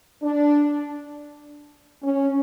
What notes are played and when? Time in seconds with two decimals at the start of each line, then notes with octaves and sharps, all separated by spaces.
0.22 D4
2.03 C#4